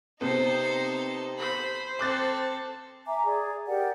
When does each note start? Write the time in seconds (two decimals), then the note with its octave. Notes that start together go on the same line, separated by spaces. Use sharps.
0.21 C3 B3 D#4 A4 C5
1.39 C5 B5
1.99 C4 A4 D6 F#6 A6
3.06 E5 G#5 A#5 D6
3.25 G#4 D5
3.67 G4 A#4 D5 F#5